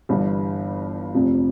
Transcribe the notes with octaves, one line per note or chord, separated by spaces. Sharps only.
G1 G2 E3
F1 F2 C3